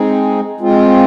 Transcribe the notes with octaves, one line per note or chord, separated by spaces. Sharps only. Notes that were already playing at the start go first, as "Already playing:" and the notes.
Already playing: G#3 C4 D#4 G#4
G#3 C4 F4